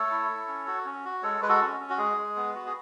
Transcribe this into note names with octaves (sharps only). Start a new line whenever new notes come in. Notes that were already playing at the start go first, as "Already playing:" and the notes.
Already playing: A3 A4 C#5
E4
E4
C#4
F#4
C#4
F#4
G#3 A4 C#5
G#3 B4
F#4 A4
C#4
C#4
F#4
G#3 G#4
G#3
B3
F#4
G#4